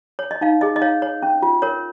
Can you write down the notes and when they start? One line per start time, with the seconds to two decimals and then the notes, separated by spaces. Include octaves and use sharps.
0.19 C#5
0.31 D#5
0.41 D#4 F5
0.61 G#4 D#5
0.76 D#5
0.82 C#5 F5
1.02 C#5
1.22 C#4
1.42 F4
1.62 A#4 C#5